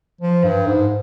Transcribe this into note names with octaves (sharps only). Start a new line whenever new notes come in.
F3
G2
G#2